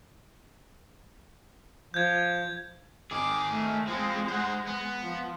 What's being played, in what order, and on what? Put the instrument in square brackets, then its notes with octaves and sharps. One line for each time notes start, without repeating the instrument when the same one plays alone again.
[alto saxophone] F3 [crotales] G6 G#6
[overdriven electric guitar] D#3 G#4 [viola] D6
[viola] A3
[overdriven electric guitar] F3 C4 [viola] G#3
[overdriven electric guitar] C5 F#5
B3
[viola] F3